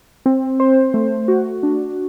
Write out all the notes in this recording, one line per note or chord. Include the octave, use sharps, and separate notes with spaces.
C4
C5
A3
F#4
D4